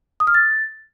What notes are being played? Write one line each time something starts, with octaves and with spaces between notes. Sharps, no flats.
D#6
F6
A6